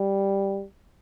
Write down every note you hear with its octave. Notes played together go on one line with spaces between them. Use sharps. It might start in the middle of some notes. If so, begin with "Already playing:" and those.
Already playing: G3